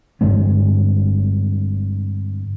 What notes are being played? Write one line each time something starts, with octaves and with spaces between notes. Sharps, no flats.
G2 D3 G#3 C4